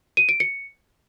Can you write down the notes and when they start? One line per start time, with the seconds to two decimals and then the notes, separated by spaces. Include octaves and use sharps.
0.17 D#7
0.29 D7
0.40 C#7